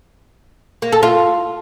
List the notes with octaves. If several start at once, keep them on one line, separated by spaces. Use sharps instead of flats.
A#3
A4
F4